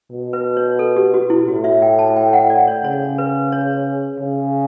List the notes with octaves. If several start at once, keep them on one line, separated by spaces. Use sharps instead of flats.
B2
B4
C#5
A4
G4
F#4
E4
A2 F#4
E5
G5
A5
G5
G5
F#5
D5
C#5
C#3 C#5
B4
C#5
C#3